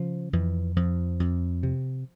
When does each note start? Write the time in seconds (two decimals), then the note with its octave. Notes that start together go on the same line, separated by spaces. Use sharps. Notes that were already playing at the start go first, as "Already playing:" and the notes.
Already playing: C#3 F3
0.33 F2 E3
0.76 F2 F3
1.20 F2
1.63 C3